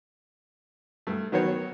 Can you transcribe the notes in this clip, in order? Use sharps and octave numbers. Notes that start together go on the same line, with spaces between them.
G2 A3
D#3 F#3 B3 A#4 C5 C#5